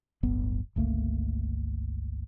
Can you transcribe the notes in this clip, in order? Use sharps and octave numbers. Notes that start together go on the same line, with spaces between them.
D1 G1 B3
G1 C#2 A3 A#3